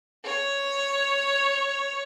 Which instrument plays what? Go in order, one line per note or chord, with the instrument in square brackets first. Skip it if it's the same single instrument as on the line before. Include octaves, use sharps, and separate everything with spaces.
[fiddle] C#5